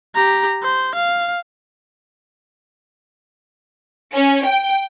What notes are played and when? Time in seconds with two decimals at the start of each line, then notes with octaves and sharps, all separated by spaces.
0.15 G4 A#5
0.63 C5
0.95 F5
4.13 C#4
4.45 G5